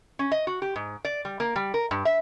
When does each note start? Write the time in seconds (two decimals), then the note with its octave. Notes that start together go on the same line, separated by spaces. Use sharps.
0.19 C#4
0.32 D#5
0.47 F#4
0.62 G4
0.76 G#2
1.05 D5
1.25 G3
1.40 A#3
1.56 G3
1.74 A#4
1.91 G2
2.05 E5